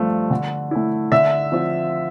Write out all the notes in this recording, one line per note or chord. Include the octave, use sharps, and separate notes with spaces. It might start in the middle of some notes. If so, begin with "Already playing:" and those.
Already playing: G2 F3 A3
D3
A3 E4
D3 E5 E6
F3 C4 F4